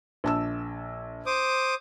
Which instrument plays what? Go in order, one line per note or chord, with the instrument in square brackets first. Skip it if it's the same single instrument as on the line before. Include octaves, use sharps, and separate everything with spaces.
[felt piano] A#1 A5 E6
[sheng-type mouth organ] C5 D6 D#6